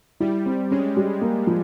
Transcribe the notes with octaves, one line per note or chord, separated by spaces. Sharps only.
G3 E4
C4
G#3 C#4
G3
A#3
F3